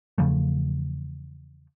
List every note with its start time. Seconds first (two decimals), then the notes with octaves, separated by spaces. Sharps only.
0.18 E2 C#3 F3 A3